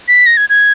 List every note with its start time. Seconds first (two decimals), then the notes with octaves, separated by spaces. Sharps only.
0.08 B6
0.26 A#6
0.37 G#6
0.49 G#6